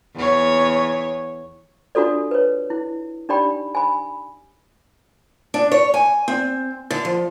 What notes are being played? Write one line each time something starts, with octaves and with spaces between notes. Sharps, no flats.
E2 C#5
D4 F4 F#4 A4 D5
B4 C#5
E4
D4 D#4 G4 D5 G5 B5
G#5 B5
D4
C#5
G#5
C4
D3
F3